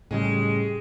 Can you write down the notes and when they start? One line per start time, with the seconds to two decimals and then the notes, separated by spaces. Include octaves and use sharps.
0.11 A2 C#3 G3 G#3